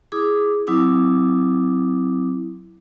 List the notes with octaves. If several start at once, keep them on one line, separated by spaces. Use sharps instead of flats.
E4 G#4 D6 D#6
F#3 C4 E4 D6 D#6